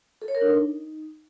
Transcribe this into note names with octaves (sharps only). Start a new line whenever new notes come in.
A4
C#5
A#4
D4
D#4